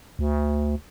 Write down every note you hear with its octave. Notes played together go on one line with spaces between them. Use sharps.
D2